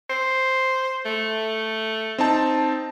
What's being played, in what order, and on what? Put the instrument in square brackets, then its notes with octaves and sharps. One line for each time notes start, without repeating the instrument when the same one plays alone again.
[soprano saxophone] C5
A3
[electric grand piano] C4 D#4 A5